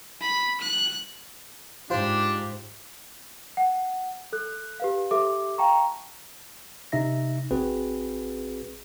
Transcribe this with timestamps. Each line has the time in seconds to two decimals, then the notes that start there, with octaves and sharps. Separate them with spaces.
0.21 B5
0.61 F#6
1.90 G#2 D4 F4 G4 C5
3.57 F#5
4.33 A4 F#6
4.80 G4 B4 F5
5.11 G4 A4 E5 D6
5.58 F5 G5 A5 A#5 C#6
6.92 C3 D#4 E5 A#6
7.51 A1 C4 F#4 G#4 B4